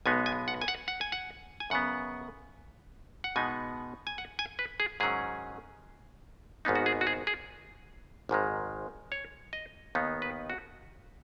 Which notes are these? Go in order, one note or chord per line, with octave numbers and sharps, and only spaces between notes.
B1 B2 G#3 B3 D#4 G#5
G#5
F#5
G#5
F#5
F#5
G#5
F#5
G#5
F#2 C#3 B3 F#5
F#5
B2 G#3 B3 D#4 G#5
G#5
F#5
G#5
B4
G#4
G#2 D#3 F#3 C#4 G#4
G#1 G#2 D#3 B3 D#4
F#4
G#4
F#4
G#4
G#4
G#1 G#2 D#3 G#3
C#5
D#5
D#2 D#3 B3 D#4
B4
F#4